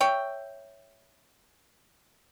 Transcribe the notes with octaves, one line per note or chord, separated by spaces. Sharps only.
C#5 E5 G5